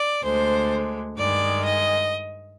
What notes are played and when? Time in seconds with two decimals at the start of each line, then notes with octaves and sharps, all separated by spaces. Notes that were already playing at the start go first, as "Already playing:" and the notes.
Already playing: D5
0.24 D2 D3 G#3 C5
1.17 G2 D#3 G#3 D5
1.64 D#5